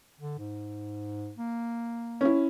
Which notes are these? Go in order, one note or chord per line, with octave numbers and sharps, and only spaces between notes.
D3
G#2
A#3
C#4 E4